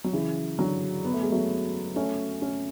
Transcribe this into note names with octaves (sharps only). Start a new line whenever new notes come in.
F#3
C#3 E3
D3 F#3
B3
A3
G#3
F#3 A3
A3 C#4
A3 C#4